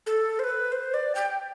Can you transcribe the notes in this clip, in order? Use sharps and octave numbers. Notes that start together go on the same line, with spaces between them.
A4
C5
B4
C5
D5
G5